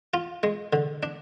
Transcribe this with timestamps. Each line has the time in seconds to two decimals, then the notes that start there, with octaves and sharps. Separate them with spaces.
0.14 F4
0.43 G#3
0.73 D3
1.03 D4